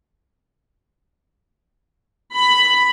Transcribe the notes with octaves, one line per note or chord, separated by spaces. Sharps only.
B5